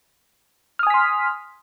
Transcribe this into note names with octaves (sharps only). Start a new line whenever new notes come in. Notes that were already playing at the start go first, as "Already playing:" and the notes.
G#5 C6 D#6 F6 B6